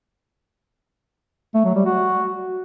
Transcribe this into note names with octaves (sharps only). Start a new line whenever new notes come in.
A3
F#3
G3
F#4